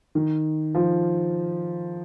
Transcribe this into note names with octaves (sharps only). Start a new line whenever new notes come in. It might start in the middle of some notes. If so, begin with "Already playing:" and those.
D#3
F3